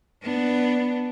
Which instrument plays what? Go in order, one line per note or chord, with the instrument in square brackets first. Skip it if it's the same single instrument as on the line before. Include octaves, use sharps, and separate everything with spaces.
[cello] B3 D4